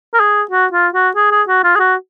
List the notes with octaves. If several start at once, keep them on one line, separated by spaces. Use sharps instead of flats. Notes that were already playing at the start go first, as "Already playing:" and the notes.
A#4
G#4
F#4
F4
F#4
G#4
G#4
F#4
F4
G#4
F#4